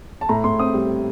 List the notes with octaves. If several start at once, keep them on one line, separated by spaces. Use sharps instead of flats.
A5
A2 A#5
A2 C6
C4 D#6
G3